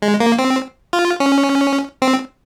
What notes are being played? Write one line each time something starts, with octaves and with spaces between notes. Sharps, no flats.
G#3
A#3
C4
F4
C#4
C4